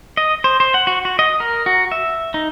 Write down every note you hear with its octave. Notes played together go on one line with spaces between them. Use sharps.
D#5
C5
C5
F#5
F#4
F#4
D#5
A#4
F#4
E5
D#4